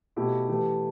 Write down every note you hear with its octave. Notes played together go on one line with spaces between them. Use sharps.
B2 A3 E4 G4
E3 A3 E4 G4